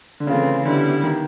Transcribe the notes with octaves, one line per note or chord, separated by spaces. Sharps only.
D3
C#3 E3 A3 C4 F4
D3 G3 B3 E4
D#3